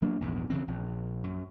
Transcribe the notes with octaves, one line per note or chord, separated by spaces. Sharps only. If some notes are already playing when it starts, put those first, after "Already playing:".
F#3 A#3 D4
A#1 E2 G#2
C#3 E3 C4
A#1
F#2